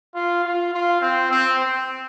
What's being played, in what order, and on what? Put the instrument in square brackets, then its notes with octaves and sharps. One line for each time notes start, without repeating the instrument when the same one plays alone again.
[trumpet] F4
F4
F4
C4
C4
C4